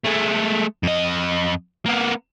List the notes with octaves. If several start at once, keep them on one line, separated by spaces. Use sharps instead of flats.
G#3 A3
F2 D#5
A#3 B3